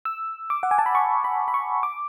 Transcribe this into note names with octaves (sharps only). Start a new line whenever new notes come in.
E6
D6
F#5
G#5
A5
B5
C#6
B5
B5
C#6
D6